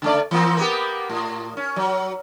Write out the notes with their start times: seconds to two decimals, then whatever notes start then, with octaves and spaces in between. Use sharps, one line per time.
0.02 C#3 A3 D5
0.31 E3 A#3 C4
0.57 A#3 B3 G4
1.09 A2
1.57 C#4
1.76 F#3